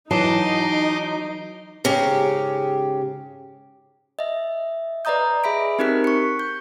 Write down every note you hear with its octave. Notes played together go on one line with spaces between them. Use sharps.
E3 F#3 D#4 D#5 A5 C6 D6
G#2 C#3 G4 A#5
D#5 E5
B4 D5 D#5 A#5 D#6 G6
G#4 E5 B5 B6 D7
C4 D#4 G4 A#4 F#6 B6
C#6 C#7
G6